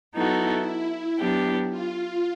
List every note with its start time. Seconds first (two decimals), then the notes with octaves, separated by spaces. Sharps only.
0.13 F#3 B3 D#4 E4 F#4 A4
1.18 F#3 B3 D4 G4
1.70 F4